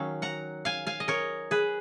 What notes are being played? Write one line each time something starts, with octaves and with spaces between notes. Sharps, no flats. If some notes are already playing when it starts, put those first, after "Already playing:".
Already playing: D#3 F#3 C#4 F5
F#5 A#5
F5 G#5
F5 G#5
D#5
A#4 C#5
G#4 B4